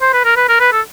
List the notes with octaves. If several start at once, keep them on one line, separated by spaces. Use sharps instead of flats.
C5
B4
A#4
B4
A#4
B4
A4